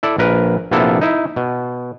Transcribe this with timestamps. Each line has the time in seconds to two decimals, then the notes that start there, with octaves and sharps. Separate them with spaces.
0.03 E4 A4 D5
0.18 A#1 A#4 B4
0.71 A#1 C3 A#3 B3 E4 A4
1.01 D#4 E4
1.36 B2